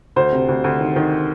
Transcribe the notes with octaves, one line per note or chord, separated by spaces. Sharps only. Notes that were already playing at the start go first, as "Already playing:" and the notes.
D2 C5
C3
D2
D2
D#3
D#3